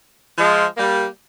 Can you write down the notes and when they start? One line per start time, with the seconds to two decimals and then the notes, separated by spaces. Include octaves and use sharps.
0.37 F3 G#3
0.77 G3 A#3